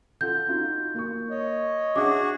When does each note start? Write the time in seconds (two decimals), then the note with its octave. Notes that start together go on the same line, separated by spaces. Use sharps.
0.21 F4 A4 F#5 G6
0.48 D#4 F4 F#4
0.94 A#3 C#6
1.30 C#5 D#5
1.96 D4 F#4 G#4 E5 F#5 D6